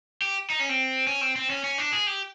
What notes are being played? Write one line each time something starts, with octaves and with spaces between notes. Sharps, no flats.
G4
D#4
C#4
C4
C#4
C4
C4
C#4
C#4
D4
G#4
G4